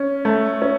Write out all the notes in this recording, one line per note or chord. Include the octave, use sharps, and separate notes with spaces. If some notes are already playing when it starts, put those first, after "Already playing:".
Already playing: C#4
A3
C#4